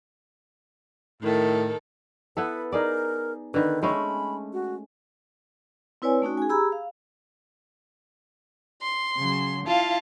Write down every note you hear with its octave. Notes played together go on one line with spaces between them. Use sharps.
A2 D#3 A4
B3 E4 A4 B4
D#4 G#4 A#4 D5
D3 D#3 B4
G#3 A3 C#4 B5
F#4
C4 E4 B4 C#5 D5 G#5
A3 C#4 D#4 F#4
G#4 G#5
G4 G#4 A#5 B5 E6
F5
C6
C#3 F#3
E4 F4 F5 A5